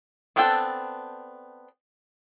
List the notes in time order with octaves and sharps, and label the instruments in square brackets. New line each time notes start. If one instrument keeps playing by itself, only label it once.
[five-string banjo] B3 C4 D4 A4 G5